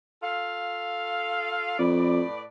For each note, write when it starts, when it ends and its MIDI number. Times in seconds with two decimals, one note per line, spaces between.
0.23 1.79 65
0.23 1.79 69
0.23 1.79 77
1.79 2.22 41
1.79 2.43 45
1.79 2.43 71
1.79 2.43 74